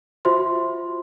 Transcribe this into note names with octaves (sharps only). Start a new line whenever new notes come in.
F4 F#4 C5 E5 C6